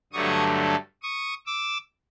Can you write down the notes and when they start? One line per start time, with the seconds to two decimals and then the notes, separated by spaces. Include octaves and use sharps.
0.12 G2 D3 F#3 A3 C#6 D#6
1.03 C#6 D#6
1.46 D6 E6